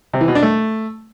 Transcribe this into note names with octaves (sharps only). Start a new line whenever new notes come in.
C3
E3
B2
D4
A3